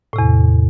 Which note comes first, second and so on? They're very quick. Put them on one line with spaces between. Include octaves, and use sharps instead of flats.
A2 C3 E2